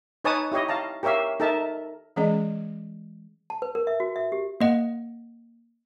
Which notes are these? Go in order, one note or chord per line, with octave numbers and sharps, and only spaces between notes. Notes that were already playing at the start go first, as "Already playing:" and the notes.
D#4 B4 C#5 G#5 A5 D#6
E4 G4 C#5 D#5
F5 A5 A#5
G4 A#4 C#5 E5 F5
D#4 A4 A#4 E5 A5
E3 G#3 C#4 G#4 D5 D#5
A5
B4
A#4
E5
F#4
E5
G4
A#3 D#5 F#5